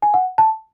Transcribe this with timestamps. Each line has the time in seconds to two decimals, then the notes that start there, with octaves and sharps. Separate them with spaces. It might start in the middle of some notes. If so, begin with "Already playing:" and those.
0.02 G#5
0.14 F#5
0.38 A5